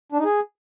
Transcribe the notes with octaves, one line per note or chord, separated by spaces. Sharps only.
D4
D#4
G#4